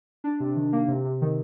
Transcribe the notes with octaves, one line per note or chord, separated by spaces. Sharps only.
D4
C3
D#3
A#3
C3
C3
D#3